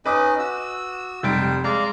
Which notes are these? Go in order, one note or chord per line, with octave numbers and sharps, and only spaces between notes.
C#4 D#4 B4 D#5 D6 D#6
F#4 E6
F1 G3 G5 C6 D7
G#3 D5 F5 A#5